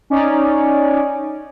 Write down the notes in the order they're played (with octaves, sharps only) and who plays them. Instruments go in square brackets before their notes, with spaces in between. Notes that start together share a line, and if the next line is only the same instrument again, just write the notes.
[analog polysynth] C#4 D#4 D5